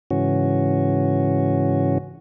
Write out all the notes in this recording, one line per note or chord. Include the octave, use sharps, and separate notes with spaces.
G#2 C#3 E3 C#4 F#4